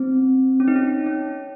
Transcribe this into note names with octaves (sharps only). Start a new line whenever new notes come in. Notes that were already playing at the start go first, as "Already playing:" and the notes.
Already playing: C4
C#4
D#4
C#4
C#4